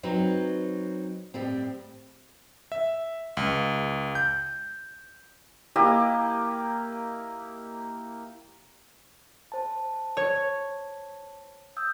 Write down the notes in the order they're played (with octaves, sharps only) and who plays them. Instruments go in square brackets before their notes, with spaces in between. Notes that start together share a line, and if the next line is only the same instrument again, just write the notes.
[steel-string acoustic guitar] F#3 C4 D#4 B4
A2 G3 C4
[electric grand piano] E5
C#2
G6
[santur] A#3 E4 G4 D#5
[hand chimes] C5 A5
[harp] C#5
[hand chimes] D#6 E6 G6